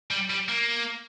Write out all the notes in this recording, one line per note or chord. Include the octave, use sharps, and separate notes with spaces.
G3
G3
A#3